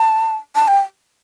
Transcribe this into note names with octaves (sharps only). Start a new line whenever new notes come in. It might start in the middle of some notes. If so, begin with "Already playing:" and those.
Already playing: A5
A5
G5